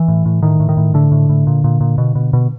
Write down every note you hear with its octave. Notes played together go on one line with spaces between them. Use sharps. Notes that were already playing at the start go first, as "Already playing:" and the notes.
Already playing: E3
A2
A2
A2 D#3
A2
D#3
A2
A2 D3
A2
A2
A#2
A#2
A#2
B2
B2
B2